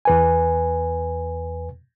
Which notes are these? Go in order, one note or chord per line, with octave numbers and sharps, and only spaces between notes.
E2 B4 G#5